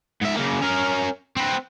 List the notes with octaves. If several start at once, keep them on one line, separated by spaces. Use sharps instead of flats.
G#2 E5
C#3 A#3
C#4 A#4
C4 B4